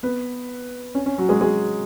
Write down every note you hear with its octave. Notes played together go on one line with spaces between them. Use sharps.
B3 B4
C#4
C#4
F#3 F#4
G#3 G#4
G#3 G#4